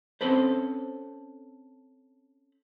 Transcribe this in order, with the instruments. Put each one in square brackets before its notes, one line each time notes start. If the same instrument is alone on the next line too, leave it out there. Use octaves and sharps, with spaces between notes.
[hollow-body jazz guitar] C4 C#4 A4 B4 C5